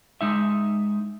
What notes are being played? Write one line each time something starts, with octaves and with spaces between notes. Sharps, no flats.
G#3 D#4 E5